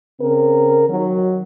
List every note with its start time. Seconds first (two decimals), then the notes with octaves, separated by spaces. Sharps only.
0.20 C#3 C4 A#4
0.88 D#3 F#3